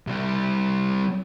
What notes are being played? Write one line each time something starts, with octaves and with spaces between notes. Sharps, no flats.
C2 G3